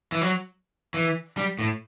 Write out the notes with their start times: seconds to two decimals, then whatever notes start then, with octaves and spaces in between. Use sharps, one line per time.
0.12 E3
0.21 F#3
0.94 E3
1.37 G3
1.59 A2